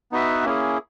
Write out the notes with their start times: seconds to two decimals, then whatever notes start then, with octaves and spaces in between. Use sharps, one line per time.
0.12 B3 D#4 F#4 B4 E5
0.44 A#3 C#4 E4 G#4